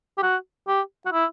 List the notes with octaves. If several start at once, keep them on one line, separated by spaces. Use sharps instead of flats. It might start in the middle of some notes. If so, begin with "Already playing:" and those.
G4
F#4
G4
F#4
E4